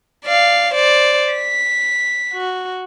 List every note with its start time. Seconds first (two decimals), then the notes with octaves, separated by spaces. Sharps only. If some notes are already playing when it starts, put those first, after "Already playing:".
0.25 D5 F5
0.74 C5 D5
1.34 B6
2.33 F#4